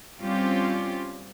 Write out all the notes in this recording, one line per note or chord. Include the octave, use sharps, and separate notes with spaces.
G3 C4 C#4 F4 G4